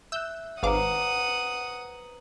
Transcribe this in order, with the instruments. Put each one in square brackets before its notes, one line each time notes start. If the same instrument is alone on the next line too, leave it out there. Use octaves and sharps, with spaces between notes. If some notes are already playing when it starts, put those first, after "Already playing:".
[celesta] E5 F#6 [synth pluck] E6 G6
[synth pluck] G#1 F5 D6 [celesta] B4 C5 A#5 [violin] F#5 D#6